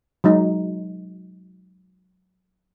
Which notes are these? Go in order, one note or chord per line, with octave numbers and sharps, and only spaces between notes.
F#3 G#3 D#4